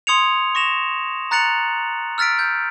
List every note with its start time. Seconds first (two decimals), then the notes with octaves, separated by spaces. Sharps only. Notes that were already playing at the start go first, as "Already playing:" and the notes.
0.07 C6 D#6 G#6 C#7 F7
0.55 C#6 A#6 E7 F7
1.31 A#5 F#6 A6 C#7 F7 F#7
2.18 E6 F6 A6 B6 D7
2.39 G6